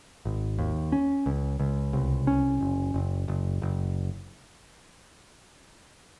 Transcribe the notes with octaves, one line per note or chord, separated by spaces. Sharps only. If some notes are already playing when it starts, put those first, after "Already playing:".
G#1
D#2
C#4
C#2
C#2
C2
C#4
F#1
F#1
F#1
F#1